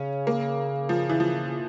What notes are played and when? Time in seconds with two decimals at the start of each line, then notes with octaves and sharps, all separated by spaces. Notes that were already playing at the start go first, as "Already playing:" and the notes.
Already playing: C#3 C#4
0.27 A#3
0.89 F3
1.10 E3
1.20 F3